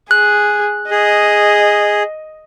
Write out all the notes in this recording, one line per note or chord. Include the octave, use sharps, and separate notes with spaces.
G#4 F#6
G#4 D#5